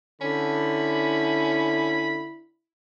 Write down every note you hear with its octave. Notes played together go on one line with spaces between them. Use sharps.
D3 C#4 E4 B5